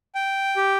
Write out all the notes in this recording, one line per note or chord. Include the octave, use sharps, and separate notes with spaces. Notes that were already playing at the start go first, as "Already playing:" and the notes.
G5
G4